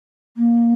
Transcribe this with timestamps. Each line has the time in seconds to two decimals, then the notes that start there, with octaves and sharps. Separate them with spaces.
0.37 A#3